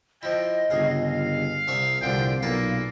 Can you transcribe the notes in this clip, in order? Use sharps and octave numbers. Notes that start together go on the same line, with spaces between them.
F3 E4 D#5 G5
G1 C#2 G#4 F5
F5
C2 E5 C#6
C2 A#2 D3 F3 F5 G5
B1 A#2 A#3 A4 B4